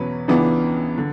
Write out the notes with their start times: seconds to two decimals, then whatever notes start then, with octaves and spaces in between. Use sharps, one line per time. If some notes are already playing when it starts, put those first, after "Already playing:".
Already playing: E2 B2 F#3 C#4 B4
0.28 C#2 C#3 E3 B3 D4
0.98 D3